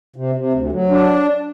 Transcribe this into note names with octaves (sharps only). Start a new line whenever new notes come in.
C3
C3
D2
F#3
D4